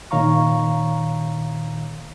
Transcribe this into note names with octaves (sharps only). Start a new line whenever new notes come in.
A#2 D#3 C#5 F5 A#5 C#6